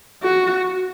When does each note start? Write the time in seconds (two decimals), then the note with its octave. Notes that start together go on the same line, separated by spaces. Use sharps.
0.23 F#4